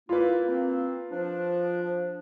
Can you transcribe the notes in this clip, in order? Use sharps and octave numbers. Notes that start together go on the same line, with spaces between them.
A#3 E4 F4 B4
A#3 C4
F3 D4